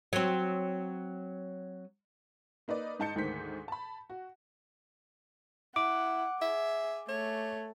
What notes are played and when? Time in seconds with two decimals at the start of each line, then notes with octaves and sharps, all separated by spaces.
0.13 F#3 C4
2.68 A#3 D#4 B4 D5
2.99 G#2 D#4 A5 G6 C#7
3.16 D2 G#2 D#3 C5 B6
3.68 A5 B5
4.10 F#4
5.76 E4 F#5 D6
6.42 G#4 E5
7.09 A3 C#5